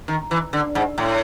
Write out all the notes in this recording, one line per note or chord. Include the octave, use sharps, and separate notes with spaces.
D#3
E3
D3
G#2
A2